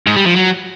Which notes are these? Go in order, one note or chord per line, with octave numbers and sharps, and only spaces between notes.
G#2
G3
F3
F#3